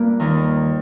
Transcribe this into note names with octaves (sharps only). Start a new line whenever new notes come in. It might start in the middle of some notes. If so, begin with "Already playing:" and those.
Already playing: G2 A#3 F4
D#2 D#3